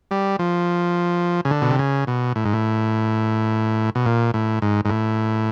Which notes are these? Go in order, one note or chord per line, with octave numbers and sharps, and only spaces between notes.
G3
F3
C#3
D3
B2
C3
C#3
B2
A2
G#2
A2
B2
A#2
A2
G#2
G#2
A2